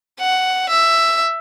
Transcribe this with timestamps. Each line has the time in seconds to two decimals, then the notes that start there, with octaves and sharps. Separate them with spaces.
0.20 F#5
0.69 E5